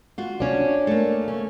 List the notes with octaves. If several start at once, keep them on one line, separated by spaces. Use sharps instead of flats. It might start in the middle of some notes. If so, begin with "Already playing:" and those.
F4 F#4
C#4 D4
A3 A#3
C#4